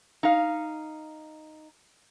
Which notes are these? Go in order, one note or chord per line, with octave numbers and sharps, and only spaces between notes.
D#4 F5